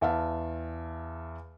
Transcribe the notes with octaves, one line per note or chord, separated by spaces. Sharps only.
E2 E5 F5 A5